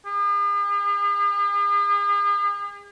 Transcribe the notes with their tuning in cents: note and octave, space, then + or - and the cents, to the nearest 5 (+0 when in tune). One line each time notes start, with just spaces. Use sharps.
G#4 -45